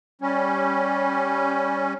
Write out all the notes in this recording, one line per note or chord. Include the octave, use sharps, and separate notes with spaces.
G3 C#4